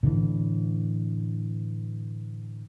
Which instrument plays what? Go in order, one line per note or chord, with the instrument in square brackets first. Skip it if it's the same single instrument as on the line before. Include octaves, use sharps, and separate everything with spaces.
[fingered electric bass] A2 D3 E3